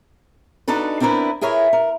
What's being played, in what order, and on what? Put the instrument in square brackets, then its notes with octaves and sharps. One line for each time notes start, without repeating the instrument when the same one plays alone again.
[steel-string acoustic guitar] D4 D#4 F#4 A4 B4
C4 D4 E4 A#4 B4
E4 G#4 A#4 B4 C#5
A#4